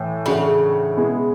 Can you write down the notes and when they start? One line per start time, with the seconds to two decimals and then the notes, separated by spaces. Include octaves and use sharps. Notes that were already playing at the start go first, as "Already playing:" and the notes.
Already playing: A2 E3
0.26 A2 C#3 E3 A3 D4 F#4
0.97 B2 G#3 B3 E4